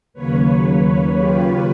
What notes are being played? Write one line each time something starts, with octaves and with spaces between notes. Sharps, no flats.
D#2 C#3 F#3 A#3 B4 C#5
F4 G4